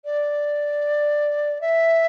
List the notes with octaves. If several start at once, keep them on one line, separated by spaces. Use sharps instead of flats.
D5
E5